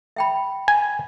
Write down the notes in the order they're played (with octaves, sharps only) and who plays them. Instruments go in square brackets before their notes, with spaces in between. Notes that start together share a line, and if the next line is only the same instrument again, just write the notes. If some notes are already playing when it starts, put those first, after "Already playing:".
[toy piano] E5 G5 B5
[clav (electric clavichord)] G#5